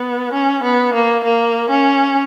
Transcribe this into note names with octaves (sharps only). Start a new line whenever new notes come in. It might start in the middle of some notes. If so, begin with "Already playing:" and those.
Already playing: B3
C#4
B3
A#3
A#3
C#4